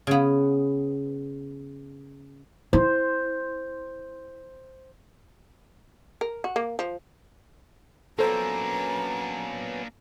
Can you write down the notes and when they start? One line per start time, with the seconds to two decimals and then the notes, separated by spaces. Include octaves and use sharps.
0.07 C#3 B3
2.73 E4 C5
6.21 A#4
6.44 F#4
6.56 A#3
6.79 F3
8.19 F#3 A#3 B3 C#4 D4 A4 C5 A#5